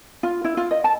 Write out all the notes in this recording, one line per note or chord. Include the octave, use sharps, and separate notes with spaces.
F4
E4
F4
D#5
A5